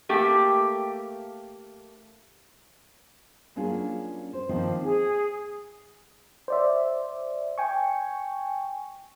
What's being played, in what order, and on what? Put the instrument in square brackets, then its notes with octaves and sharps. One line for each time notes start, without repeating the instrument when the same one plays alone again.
[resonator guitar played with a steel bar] A3 A#3 G4
[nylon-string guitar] F#3 A#3 C#4 D4 F4 G#4
C5
D#3 F3 A#3 C4 D4 D#4
[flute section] G#4
[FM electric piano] C5 D5 E5
G5 G#5 C#6